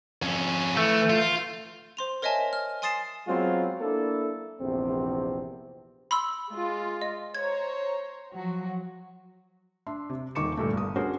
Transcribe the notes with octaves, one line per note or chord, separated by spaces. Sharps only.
F2 C#4
E3 A3
F4
C5 C6 F7
A#4 C#5 D#5 E5 G#5 A5
F6
G#5 C6 D#6 A6 C7 E7
F#3 G#3 B3 C4 F4
A#3 D4 E4 A4
A#1 E2 C3 C4
B5 C6 E6
G#3 F4
D#5
C5 C#5 A#5 G#6
F3 F#3 F#4
D4 E5 C6
C3
D#1 D#3 C#6 D6 C#7 E7
G2 A#2 D3 A3
G1 D#6
C#4 D4 F#4 G#4 A#4 C5